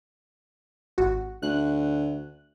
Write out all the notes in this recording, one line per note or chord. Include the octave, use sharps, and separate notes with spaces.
G#1 F#4
D2 F#6